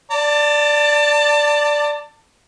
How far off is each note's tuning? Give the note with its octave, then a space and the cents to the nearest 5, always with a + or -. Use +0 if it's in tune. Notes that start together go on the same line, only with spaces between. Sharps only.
D5 +0 A5 +30